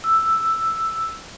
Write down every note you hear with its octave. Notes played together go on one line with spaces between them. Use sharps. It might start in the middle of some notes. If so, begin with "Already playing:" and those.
E6